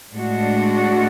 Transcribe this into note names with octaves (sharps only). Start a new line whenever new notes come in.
A2 G#3 D4 F#4